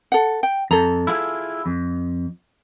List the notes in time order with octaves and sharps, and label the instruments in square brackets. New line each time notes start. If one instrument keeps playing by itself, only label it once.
[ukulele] A4 F#5
G5
[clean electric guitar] F2 [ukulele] A4 A#5
[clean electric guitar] E4 F4 G#4
F2